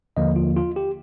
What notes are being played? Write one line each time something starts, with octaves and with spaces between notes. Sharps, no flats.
D#2 D3 F3 A#3 D#5
F4
F4
G4